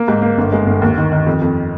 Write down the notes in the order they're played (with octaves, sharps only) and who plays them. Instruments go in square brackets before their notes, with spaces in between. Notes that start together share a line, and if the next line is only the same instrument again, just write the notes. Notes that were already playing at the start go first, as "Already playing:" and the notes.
Already playing: [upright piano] A#3
G#2
A#3
G1
G#3
G1
D#2
D#3
D#3
F2
F2